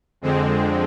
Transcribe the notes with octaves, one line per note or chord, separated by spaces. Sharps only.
F2 D3 G#3 C4